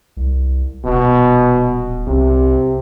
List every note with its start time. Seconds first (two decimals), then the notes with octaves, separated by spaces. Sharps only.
0.17 C2
0.84 D#1 B2
2.07 C2 C3